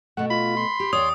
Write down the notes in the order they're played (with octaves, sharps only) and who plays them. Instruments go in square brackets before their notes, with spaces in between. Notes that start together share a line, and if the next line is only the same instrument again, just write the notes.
[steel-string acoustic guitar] B2 A3 [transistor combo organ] F#5
[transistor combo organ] F4 [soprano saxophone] B5
[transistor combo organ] C6
[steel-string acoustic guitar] G4
[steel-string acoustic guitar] D#2 D5 [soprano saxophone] C#5 [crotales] D#6